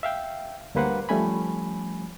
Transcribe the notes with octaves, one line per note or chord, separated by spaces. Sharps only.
E5 F5 G5
D2 G3 A#3 B4 C5 F#5
F3 G3 A3 C#4 G#5 B5